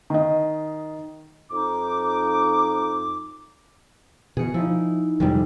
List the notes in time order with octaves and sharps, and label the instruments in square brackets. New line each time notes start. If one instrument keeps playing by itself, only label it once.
[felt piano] D#3 D#5
[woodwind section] F2 D#4 D6
[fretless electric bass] B2 E3 [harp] G#4 C#7
[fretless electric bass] F3 [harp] D#4 E4
[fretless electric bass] F2 D#3 [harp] C3 G3 G#3